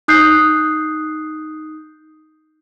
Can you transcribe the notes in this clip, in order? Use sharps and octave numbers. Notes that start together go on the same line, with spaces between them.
D#4 D#6 F#6 G6 C7